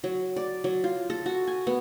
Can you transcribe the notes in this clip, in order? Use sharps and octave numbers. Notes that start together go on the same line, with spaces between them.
F#3
D5
F#3
F4
A4
F#4
G#5
B3